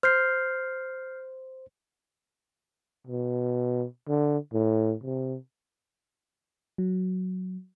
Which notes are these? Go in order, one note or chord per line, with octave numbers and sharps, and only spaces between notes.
C5 F6 G6 C7
B2
D3
A2
C3
F#3